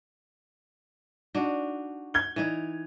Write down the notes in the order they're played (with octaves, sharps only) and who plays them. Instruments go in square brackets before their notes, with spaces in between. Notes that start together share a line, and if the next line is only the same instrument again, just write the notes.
[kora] D4 D#4 F#4
[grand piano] G#6 G7
[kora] E3 D#4